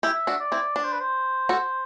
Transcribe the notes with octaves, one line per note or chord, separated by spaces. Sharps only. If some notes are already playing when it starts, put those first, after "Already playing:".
E4 G4 E5
D4 F#4
D5
C4 E4
D4 D5
C5
B4
C5
F#4 A4